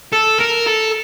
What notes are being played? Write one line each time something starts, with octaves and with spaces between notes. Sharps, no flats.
A4
A#4
A4